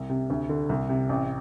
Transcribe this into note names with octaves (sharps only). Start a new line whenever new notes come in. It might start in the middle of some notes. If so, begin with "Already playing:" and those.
Already playing: C2
C3
D2
D3
C2
C3
A1